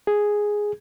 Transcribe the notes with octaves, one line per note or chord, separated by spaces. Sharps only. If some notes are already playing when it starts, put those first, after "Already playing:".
G#4